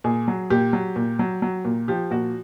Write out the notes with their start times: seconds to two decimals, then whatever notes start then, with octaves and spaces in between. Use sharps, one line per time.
0.04 A#2 G#4
0.28 F#3
0.50 A#2 G4
0.73 F#3
0.96 A#2
1.19 F#3
1.42 F#3
1.65 A#2
1.88 F3 G4
2.11 A#2 F#4